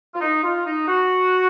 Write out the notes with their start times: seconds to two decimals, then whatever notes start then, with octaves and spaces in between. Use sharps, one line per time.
0.13 F4
0.21 D#4
0.43 F4
0.65 D#4
0.87 F#4